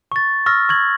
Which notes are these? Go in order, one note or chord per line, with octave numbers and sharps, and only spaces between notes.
C#6 A6
C#6 E6 F6 A#6
C#6 G#6 F#7